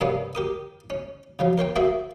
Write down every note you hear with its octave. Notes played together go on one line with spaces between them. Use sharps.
G2 C3 A#3 B3 C#4 D4
G4 A#4 D#6
C#4
C#3 F3 F#3
A#4 C5 C#5 G5
A#3 F#4 G#4 C5 E5